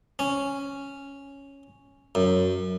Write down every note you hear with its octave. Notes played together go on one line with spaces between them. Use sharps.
C#4
F#2